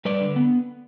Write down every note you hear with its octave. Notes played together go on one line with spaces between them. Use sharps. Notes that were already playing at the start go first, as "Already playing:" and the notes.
G3 B4 D5
D3
B3